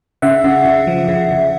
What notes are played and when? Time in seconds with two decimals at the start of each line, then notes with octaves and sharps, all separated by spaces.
0.22 C#3 E5 F#5
0.44 C#3
0.65 C#3
0.87 F3
1.08 C#3
1.31 C#3